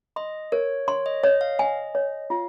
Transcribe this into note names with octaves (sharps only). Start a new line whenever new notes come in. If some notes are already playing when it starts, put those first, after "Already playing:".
D#5 C6
A#4 C#5
C#5 C6
D#5
C#5 D#5
F5
D#5 G#5
C#5
F4 F5